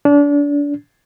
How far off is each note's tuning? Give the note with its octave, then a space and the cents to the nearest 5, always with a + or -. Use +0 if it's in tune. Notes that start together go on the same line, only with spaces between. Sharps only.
D4 -30